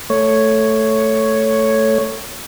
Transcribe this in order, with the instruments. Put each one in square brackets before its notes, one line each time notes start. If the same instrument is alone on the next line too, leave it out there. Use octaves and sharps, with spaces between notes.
[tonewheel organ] A3 C#5